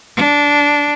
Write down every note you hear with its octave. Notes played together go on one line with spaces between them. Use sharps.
D4